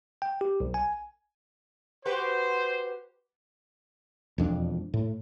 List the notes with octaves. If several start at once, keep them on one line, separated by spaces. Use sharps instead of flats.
G5
G4
B1
G#5
F#4 G4 B4 C5
E1 F2 D4
A2